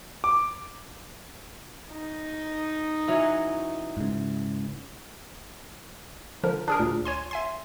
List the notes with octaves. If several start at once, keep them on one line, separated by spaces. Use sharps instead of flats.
D6
D#4
E3 F#3 C#4
G#2 C#3
D3 F3 A#4
D4 G#4 A#4
D2 A#2
C#5 G#5 C6
E5 G#5 C6